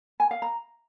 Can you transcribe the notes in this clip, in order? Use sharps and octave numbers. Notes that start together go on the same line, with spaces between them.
G#5
F5
A#5